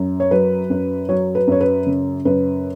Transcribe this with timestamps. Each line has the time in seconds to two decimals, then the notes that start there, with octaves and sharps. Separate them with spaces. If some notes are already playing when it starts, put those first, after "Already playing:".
Already playing: F#2
0.20 C#5
0.31 F#3 B4
0.70 F#2
1.09 F#3 C#5
1.35 B4
1.47 F#2 C#5
1.61 B4
1.86 C#3
2.25 F#2 B4